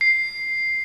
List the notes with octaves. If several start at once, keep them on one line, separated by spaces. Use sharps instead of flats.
C7